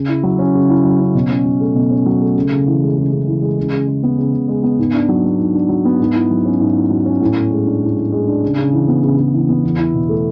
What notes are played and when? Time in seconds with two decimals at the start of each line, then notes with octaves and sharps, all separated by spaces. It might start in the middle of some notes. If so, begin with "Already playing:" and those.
Already playing: C#3
0.08 E4
0.23 F#3
0.39 C#4
0.54 C#3
0.69 E4
0.84 F#3
0.99 C#4
1.14 B2
1.30 C#4
1.45 F#3
1.60 A3
1.75 B2
1.91 C#4
2.06 F#3
2.21 A3
2.36 C#3
2.51 C#3
2.67 E3
2.81 G#3
2.97 C#3
3.12 C#3
3.27 E3
3.42 G#3
3.58 C#3
3.72 C#3
3.87 G#3
4.03 B3
4.18 C#3
4.33 C#3
4.48 G#3
4.63 B3
4.78 G#2
4.94 D4
5.09 F#3
5.24 B3
5.39 G#2
5.54 D4
5.69 F#3
5.85 B3
6.00 G#2
6.15 E4
6.31 F#3
6.45 C#4
6.60 G#2
6.76 E4
6.90 F#3
7.06 C#4
7.21 A2
7.37 A2
7.51 G#3
7.67 D4
7.82 A2
7.97 A2
8.12 G#3
8.27 D4
8.42 C#3
8.58 C#3
8.72 E3
8.88 B3
9.03 C#3
9.18 C#3
9.33 E3
9.49 B3
9.64 E2
9.78 E4
9.94 B2
10.09 A3